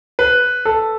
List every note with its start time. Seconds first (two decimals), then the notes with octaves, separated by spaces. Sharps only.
0.19 B4
0.65 A4